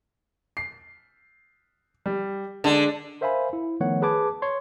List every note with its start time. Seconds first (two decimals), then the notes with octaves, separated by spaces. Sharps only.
0.57 C7
2.06 G3
2.64 D3 G#3 D4
3.21 A#4 C5 E5 F5 G#5 B5
3.53 E4
3.80 D#3 F3 A3 B3 C#5 F#5
4.02 G#4 B4 A5 D6 G#6
4.42 C#5 C6